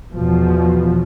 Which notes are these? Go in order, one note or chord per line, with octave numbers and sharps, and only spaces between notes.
E2 B2 F3